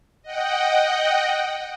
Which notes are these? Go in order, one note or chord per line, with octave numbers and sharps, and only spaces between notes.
D#5 F#5 G5